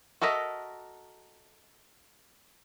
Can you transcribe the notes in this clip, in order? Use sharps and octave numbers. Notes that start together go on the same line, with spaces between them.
F#4 A4 A#4 D#5 E5